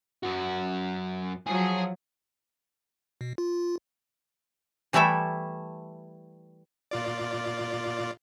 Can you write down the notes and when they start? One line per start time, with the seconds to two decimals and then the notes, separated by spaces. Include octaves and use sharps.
0.23 F#2 F#4
1.46 F3 F#3 G#4 G#5
3.21 B2
3.38 F4
4.93 E3 G3 A3 E4 A4 E5
6.91 A#2 F4 D5